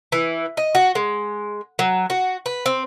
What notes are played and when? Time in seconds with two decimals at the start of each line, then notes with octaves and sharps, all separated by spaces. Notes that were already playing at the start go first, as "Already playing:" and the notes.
0.12 E3
0.57 D#5
0.75 F#4
0.95 G#3
1.79 F#3
2.10 F#4
2.46 B4
2.66 C4